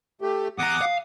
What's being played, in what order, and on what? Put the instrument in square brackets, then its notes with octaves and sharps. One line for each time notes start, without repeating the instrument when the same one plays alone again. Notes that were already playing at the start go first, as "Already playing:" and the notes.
[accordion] A3 G4
[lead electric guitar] E2 A#5 [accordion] F#5 D6 D#6
[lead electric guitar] F5